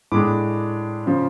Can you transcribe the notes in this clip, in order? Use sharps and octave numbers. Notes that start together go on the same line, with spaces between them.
A2 G#3 D4 B5 D6
C#3 F3